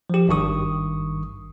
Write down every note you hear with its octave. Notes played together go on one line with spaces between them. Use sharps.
F3 G4
G#1 G2 D#3 C#6 D#6